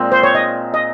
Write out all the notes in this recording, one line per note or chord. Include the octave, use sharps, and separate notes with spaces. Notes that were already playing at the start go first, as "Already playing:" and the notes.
Already playing: A#2 G#3 C4
C5
C#5
D#5
D#5